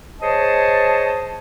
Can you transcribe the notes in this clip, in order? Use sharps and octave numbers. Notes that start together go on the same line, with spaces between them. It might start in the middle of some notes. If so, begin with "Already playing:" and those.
G#4 C5 C#5 D#5 A5